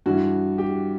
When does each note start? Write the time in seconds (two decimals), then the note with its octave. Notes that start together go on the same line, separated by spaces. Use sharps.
0.06 G2 E3 F#4
0.58 G4